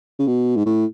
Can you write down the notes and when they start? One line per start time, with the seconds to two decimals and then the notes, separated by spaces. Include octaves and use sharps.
0.19 C#3
0.27 B2
0.57 G#2
0.66 A2